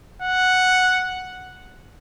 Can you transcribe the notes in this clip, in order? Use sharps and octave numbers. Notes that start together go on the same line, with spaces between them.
F#5